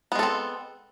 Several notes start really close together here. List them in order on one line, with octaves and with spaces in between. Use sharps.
B3 G#3 A4 C4